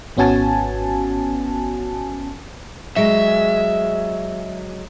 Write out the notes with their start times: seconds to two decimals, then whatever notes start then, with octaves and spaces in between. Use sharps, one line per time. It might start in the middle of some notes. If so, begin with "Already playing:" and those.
0.17 G#1 B3 C#4 F#4 G#5 A5
2.96 F#3 G#3 E5